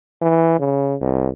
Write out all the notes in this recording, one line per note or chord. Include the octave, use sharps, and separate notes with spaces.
E3
C#3
C2